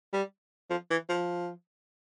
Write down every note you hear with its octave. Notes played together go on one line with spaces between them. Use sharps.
G3
F3
E3
F3